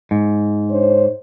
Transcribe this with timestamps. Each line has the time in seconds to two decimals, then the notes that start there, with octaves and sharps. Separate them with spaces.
0.11 G#2
0.71 D4 C5 C#5